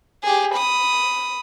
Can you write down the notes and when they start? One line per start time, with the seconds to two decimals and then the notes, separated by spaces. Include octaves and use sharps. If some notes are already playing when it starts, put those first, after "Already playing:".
0.23 G4 G#4
0.55 B5 D#6